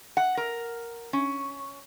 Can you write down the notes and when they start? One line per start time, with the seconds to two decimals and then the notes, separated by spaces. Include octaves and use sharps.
0.17 F#5
0.37 A#4
1.13 C#4